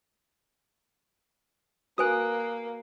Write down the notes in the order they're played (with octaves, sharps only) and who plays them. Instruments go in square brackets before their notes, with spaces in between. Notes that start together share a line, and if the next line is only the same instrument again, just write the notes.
[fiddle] A#3 [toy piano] F#4 B4 G#5 [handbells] D#6 F#6